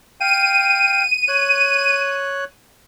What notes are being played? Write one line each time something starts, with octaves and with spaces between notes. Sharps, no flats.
F5 G5 D#7
C#5 F#6